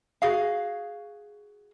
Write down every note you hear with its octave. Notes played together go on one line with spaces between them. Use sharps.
F#4 G#4 F5